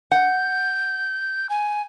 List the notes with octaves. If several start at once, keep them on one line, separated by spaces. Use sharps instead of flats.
F#5 G6
G#5